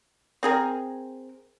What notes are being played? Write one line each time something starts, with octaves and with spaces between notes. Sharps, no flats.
C4 G#4 A#4